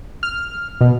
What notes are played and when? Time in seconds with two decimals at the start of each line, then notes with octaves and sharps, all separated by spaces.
0.23 F6
0.81 B2